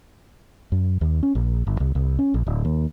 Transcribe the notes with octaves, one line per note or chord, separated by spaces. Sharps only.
F#2
D#2
C#4
A#1
G1
C2
C2
C#4
A#1
D1
D#2